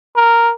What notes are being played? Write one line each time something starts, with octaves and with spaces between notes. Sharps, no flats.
A#4